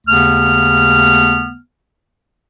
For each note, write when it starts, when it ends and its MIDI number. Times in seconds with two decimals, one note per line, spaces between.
0.07 1.55 39
0.07 1.55 49
0.07 1.55 57
0.07 1.55 59
0.07 1.55 89